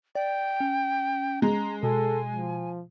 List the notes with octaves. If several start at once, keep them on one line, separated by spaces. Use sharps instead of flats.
D5 G5
C#4
G#3 A#5
B2 A4 G#5
F3